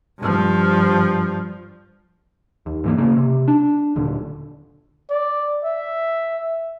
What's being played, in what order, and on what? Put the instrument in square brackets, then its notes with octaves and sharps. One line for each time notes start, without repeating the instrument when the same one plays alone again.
[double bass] G2 F3
[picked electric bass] D#2
G#2 E3 A#3
C#3 A#3
C3
D4
D#1 D3
[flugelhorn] D5
E5